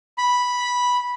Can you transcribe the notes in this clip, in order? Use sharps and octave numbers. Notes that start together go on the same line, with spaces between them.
B5